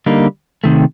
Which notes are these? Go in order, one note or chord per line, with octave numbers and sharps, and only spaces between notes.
D3 G3 A#3 D#4
C3 D#3 A3